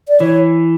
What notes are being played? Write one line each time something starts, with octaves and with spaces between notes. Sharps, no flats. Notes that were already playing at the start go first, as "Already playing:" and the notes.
D5
E3 C#5